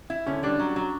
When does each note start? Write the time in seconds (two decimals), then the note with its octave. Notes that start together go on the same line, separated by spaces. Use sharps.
0.10 E4
0.26 D3 C#4
0.43 G3 D4
0.59 F#3
0.76 F#3